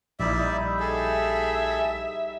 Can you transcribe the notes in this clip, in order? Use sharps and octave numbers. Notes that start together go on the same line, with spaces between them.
A#1 G3 D#4 E4 D5 E5
G#4 A4 E5